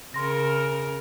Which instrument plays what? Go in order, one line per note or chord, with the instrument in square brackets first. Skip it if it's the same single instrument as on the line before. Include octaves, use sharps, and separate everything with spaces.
[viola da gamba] C#3 A#4 [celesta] C6 A#6